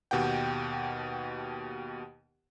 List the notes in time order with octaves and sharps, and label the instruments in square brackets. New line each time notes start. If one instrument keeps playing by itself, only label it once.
[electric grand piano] D#2 B2 G4 F#5 G5